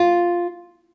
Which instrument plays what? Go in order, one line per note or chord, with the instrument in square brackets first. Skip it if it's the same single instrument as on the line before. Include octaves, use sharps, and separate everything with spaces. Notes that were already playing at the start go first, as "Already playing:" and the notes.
Already playing: [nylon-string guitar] F4